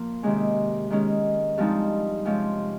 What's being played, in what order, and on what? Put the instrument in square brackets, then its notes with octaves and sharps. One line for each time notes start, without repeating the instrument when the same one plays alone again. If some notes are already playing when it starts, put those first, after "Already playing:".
Already playing: [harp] A#2 F3 A#3
C3 D#3 G#3 C#4
D#3 G#3 C#4
G2 F3 G#3 C4 D#4
C3 F3 G#3 C#4